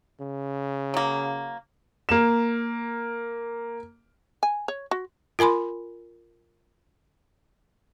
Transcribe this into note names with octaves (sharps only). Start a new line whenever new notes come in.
C#3
F#3 A#3
A#3 E7
G#5
C#5
F#4
F4 A#4 G#5 B5 C6